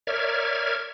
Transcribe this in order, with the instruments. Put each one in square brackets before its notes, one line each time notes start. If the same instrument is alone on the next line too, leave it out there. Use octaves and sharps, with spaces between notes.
[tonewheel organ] A#4 C#5 D5 E5 F6 G#6